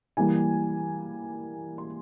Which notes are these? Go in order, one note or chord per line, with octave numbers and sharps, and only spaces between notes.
E3 G3 A#3 G#5
C6